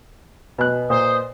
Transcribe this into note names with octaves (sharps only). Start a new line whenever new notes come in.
B2 B4 D#5 G#5 F#6
A#2 C5 D#6